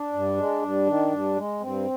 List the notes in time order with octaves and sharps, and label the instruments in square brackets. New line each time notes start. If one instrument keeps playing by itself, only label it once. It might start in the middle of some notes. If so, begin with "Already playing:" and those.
Already playing: [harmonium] D4
G2
G#3
G2
D#3
G2
G#3
G2 C4